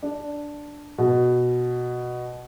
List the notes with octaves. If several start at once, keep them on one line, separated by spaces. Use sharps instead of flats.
D4
B2